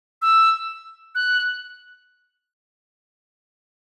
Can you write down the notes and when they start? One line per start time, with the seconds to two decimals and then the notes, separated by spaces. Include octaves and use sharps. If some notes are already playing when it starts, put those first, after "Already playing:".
0.22 E6
1.15 F#6